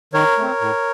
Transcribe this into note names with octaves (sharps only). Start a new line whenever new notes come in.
D#3 A#4 C#5
A3 C4
A2